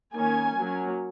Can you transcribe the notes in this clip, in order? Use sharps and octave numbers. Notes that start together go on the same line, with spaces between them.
D#3 A#3 C#4 G#5
F#3 A#3 C#4